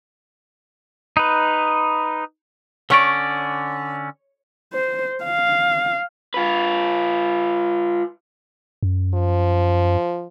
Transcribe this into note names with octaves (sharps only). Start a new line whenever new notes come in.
D#4 B4
D3 C#4 C#5 D5
C5
F5
F4 B4
F#2
F3